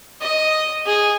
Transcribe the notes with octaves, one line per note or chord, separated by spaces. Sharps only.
D#5
G#4